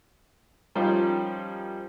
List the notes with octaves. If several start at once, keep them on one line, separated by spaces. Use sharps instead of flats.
F3 G3 C#4 D#4 A#4 C5